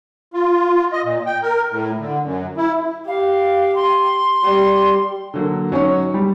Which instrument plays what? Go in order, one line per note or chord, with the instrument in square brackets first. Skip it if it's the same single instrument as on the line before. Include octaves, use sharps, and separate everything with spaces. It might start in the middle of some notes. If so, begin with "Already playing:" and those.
[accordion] F4
D#5
A#2
G5
A#4
A2
D3
F#2
E4
[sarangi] G4 [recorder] F5
[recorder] C6
[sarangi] G3
[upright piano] D3 F#3 A#3
G#2 F#3 C#4 D#4 C#5
G3